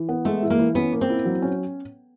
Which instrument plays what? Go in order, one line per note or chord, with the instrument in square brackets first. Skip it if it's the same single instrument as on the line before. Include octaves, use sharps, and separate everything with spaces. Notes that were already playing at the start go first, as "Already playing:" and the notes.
Already playing: [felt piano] E3
B3
[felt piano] G#3 [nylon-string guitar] A3
[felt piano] E3
[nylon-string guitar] A#3
[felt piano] E3
[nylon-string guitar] B3 [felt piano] C#4
[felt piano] A#3
[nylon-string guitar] C4
[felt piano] E4
F#3
C#4